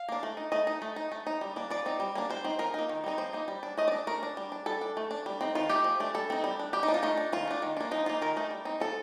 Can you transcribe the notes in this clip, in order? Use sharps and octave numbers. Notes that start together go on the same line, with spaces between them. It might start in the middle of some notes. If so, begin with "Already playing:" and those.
Already playing: F5
A#3 D4
A3
D#4
A3 D#5
D#4
A3
D#4
A3
D#4
G3
A#3 D4
F3 D5
C4 D#4
G3
A#3 D4
G3 C5
C4 D#4
F3 A#4
A#3 D#4
D#3
G3 C4 D#4
F3 C5
A#3 D#4
G3
D4
A3 D#5
D5
D4
A3 A#4
D4
G3
D4
G3 A4
D4
A3
D4
G3
C4 D#4
D#3 F4
A3 D#4 G4
F3
A3 D4
G3 A4
C4 D#4
G3
D4
G3 G4
D#4
D4
F4
A3 D#4
D4
D#3 F4
A3 D4
D#3
A#3 D4
F3 D#4
A#3 D#4 F4
D#3 A#4
A3 D#4
G3
C4 D#4
F3 A4